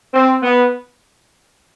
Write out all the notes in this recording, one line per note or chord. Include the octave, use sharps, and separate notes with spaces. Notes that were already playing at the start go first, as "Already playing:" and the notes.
C4
B3